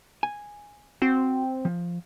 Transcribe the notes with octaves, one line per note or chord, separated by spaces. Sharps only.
G#5
C4 F#4
F3